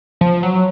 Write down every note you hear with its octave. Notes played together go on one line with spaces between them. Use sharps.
F3
F#3